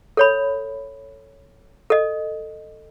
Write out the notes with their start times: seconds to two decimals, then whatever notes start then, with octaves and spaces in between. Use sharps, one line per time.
0.17 A4 C#5 B5
1.90 A4 D#5